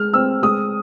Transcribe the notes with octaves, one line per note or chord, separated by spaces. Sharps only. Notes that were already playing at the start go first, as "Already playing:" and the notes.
Already playing: G#3 F6
C4 E6
G#3 D#6